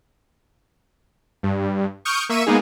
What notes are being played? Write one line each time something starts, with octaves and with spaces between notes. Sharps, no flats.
G2
C#6 D#6 F6 G6 D7
A#3 E5 C#6 E6 D#7
G#3 A#3 B3 D#4 G#4